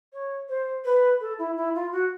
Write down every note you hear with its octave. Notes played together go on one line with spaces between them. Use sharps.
C#5
C5
B4
A4
E4
E4
F4
F#4